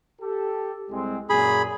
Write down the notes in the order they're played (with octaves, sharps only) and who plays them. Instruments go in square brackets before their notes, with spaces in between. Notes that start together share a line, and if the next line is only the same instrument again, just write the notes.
[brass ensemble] G4 A4
C2 G#3 C4
[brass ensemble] F#2 A#2 [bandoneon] G#4 B5